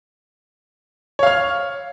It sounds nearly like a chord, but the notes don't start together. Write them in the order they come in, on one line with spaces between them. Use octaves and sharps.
C#5 F5 F6